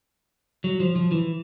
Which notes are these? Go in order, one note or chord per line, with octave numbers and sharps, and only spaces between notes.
F#3
F3
F3
E3